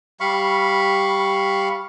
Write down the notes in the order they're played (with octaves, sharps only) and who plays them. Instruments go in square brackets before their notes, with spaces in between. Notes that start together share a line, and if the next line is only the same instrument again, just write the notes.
[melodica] G3 F5 B5 C#6